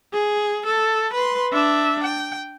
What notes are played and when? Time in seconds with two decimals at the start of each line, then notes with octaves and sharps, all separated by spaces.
0.13 G#4
0.66 A4
1.13 B4 C6
1.52 D4 E5
2.04 G5